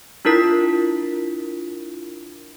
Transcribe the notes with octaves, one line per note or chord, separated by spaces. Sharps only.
D4 E4 F4 A#4 B6